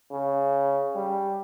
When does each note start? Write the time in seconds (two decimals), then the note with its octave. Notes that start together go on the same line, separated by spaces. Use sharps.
0.11 C#3
0.95 G3